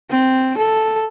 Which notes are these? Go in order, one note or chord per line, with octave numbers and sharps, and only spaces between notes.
C4
A4